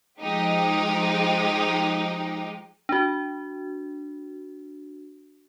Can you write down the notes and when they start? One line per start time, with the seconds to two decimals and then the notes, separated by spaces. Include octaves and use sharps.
0.20 F3 G#3 D#4 G4
2.89 D4 F#4